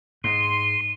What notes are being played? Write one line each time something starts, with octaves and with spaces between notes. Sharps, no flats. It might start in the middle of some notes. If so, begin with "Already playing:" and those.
G#2 C6 D#7